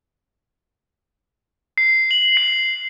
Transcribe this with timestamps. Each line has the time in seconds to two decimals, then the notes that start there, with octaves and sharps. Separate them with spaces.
1.78 C7
2.11 F#7
2.37 C7